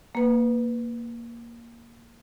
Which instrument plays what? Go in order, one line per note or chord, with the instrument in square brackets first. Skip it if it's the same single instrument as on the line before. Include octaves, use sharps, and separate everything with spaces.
[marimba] A#3 B4